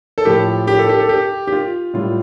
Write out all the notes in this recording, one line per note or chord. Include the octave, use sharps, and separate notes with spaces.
A4
A2 F3 G4
G4
A4
G4
A4
G4
G4
F4
A2 G3 F4